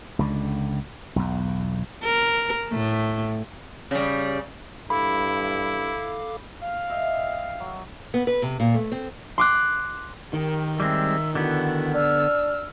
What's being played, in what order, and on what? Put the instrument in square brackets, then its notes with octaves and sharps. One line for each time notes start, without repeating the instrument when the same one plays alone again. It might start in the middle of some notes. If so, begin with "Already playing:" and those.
[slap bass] C#2 D3
B1 E2
[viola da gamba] A#4
A2 A3
[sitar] C#3 G3
[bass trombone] G2 [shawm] E4 [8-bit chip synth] A4 F5 D6 [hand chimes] B5
[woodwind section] F5
[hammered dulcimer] D#5 E5 G5
F#3
[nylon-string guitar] B3
B4
C3
A#2
A3
C4
[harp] C6 D6 F#6
[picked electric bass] D#3 [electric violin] G4 A#4
[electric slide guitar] G3 G#3 C4 [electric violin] E5 E6
[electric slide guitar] D3 B3 [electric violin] E4 F#4
[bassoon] D4 [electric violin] E6 F6